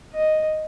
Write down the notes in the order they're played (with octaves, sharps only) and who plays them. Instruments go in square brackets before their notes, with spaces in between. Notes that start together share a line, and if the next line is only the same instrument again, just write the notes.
[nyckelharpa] D#5